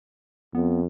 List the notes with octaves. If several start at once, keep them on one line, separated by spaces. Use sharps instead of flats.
F2 B3